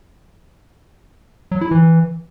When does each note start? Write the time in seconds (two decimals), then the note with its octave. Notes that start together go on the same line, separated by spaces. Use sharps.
1.52 F#3
1.61 E4
1.71 E3